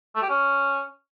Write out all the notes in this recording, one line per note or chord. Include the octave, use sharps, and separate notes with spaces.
A3
G4
C#4